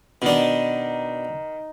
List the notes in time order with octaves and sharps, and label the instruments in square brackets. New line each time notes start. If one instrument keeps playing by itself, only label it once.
[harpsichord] B2 D4 [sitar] D#3